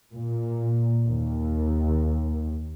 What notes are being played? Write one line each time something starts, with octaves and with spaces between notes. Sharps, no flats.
A#2
D#2